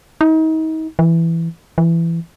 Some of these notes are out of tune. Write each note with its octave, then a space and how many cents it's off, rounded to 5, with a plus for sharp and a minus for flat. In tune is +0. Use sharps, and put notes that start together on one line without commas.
D#4 +35
E3 +10
E3 +20